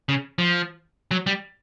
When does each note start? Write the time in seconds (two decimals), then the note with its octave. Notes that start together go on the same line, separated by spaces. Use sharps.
0.09 C#3
0.39 F3
1.11 F#3
1.27 G3